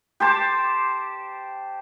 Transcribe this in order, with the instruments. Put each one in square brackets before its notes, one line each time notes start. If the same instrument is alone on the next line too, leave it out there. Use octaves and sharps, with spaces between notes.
[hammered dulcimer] G4 C5 A5 D6